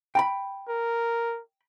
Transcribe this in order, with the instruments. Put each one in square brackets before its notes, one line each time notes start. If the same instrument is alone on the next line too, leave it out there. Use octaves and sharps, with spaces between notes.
[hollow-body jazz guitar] G5 A#5 B5
[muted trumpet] A#4